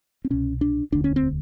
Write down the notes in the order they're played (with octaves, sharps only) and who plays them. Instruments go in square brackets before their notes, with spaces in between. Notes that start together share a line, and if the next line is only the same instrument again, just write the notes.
[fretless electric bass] C4
C2 B2 C#4
D4
E1 D2 D3 D4
C#4
C4